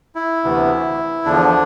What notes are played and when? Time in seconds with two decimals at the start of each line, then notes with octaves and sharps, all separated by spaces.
0.15 E4
0.44 D2 C3 E3 B3
1.25 E2 D3 F3 D4